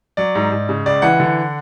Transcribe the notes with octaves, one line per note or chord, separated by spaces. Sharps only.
F#3 D5
G#2
G#2
C#3
C#2 D5
E3 F#5
D3